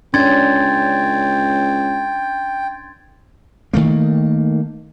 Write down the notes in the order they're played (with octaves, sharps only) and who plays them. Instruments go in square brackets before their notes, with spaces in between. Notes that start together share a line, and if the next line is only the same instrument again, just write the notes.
[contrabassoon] C#2 [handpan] C#4 D4 [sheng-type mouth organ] G5 [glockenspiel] C6 G#6 A6
[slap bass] D#3 A3 A#3